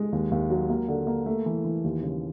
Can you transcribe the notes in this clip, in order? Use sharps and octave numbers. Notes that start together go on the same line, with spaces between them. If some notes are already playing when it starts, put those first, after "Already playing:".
Already playing: G#3
D#2
D#2
F#3
A#3
D3
A#3
A3
E3
E3
D#2
C#3